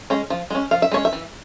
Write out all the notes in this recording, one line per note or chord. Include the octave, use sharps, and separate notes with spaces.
G#3 C#4
F3
G#3 C#4
F3 F5
E5
G#3 C#4 C#5
E5
E3